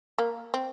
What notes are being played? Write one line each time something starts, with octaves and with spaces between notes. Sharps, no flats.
A#3
C4